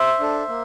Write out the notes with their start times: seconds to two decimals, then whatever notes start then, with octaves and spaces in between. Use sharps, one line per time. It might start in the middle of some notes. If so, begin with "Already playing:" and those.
Already playing: C5 E5
0.20 D4 A4
0.49 A#3